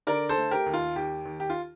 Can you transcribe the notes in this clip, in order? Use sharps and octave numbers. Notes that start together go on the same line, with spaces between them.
D3 A#4 D5
A4 C5
A3
G4 A#4
D#2
F4
D#2 G4
D#2
G4
F4